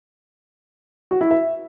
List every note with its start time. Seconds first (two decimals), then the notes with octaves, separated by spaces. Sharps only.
1.11 F#4
1.21 E4
1.31 E5